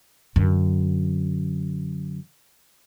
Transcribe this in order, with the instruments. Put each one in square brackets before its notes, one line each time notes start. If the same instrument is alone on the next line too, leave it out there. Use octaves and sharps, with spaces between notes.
[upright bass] F#2 D3